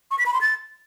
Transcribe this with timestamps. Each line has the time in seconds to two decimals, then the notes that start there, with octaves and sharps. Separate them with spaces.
0.11 C#6
0.18 B6
0.26 B5
0.33 C6
0.41 A6